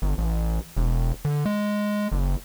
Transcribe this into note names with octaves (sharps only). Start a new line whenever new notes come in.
G1
A1
E1
D3
G#3
F#1